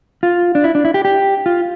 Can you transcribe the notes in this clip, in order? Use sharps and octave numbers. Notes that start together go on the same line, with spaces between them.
F4
D4
E4
D4
E4
G4
G4
F4